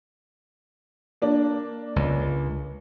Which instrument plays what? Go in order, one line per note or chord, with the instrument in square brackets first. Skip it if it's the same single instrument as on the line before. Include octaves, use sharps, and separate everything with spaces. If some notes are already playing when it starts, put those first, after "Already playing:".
[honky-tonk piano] A#3 D4
[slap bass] C#2